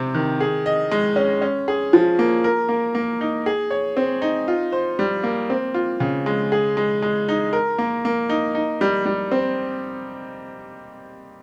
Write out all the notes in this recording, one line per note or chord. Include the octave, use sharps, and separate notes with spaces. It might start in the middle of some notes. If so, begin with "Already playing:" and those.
Already playing: C3 C4
D#3
G#4
D#5
G#3
C#4
C#4
G#4
F3
A#3
A#4
A#3
A#3
D#4
G#4
C#5
C4
D#4
F4
C5
G3
A#3
C4
F4
C#3
G#3
G#4
G#3
G#3
D#4
A#4
A#3
A#3
D#4
D#4
G3
G3
C4